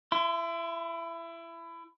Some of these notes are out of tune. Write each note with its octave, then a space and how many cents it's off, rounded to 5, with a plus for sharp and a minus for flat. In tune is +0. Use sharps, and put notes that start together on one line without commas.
E4 +25 C6 -40